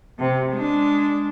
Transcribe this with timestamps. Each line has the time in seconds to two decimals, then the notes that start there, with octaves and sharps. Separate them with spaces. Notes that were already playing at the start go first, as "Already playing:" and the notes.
0.18 C3
0.53 G#3 D4